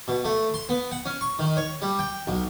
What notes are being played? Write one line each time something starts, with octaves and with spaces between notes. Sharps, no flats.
B2
A3
C6
B3
F#5
C#4
C#6
D#3
C#5
G3
G5
B1